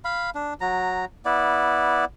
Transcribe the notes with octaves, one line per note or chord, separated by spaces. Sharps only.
F5 B5
D4
F#3 A#5
B3 E4 D5